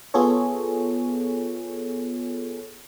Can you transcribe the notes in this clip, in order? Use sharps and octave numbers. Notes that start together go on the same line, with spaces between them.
B3 F4 G#4 A4 C#5